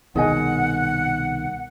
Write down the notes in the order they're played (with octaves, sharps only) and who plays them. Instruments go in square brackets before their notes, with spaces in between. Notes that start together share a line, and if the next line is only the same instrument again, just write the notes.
[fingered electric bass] C2 B2 D#3 [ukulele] G#4 D#5 G#5 [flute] F#5